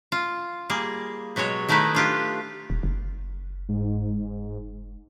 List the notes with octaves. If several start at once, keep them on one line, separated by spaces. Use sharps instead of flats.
F4
G3 A#3 G#4
B2 F#3 G#3 C#5
D#3 A3 D#4 E4 B4
D4 F4 G4
D#1
F#1
G#2